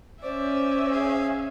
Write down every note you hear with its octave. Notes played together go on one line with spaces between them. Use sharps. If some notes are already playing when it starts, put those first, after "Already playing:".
C#4 C5 D5 E5
G#4 F5